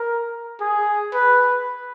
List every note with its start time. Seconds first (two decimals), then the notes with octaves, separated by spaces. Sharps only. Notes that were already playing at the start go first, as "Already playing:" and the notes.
Already playing: A#4
0.61 G#4
1.14 B4